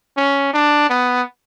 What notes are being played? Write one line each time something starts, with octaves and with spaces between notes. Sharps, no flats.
C#4
D4
B3